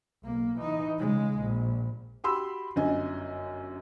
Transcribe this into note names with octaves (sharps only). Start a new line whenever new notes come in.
B1 A#3
E3 D#4
C#3 G#3
A#1
F#4 G4 B5 C6 E6
G1 F#2 D#5 G#5